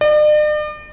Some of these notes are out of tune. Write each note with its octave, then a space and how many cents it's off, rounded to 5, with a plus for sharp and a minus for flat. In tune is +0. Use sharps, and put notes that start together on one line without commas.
D5 +45